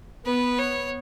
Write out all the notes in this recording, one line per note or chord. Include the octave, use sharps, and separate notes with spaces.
B3 B4
C#5